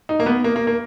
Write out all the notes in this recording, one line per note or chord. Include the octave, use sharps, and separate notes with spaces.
D#4
A#3
B3
A#3
A#3
A#3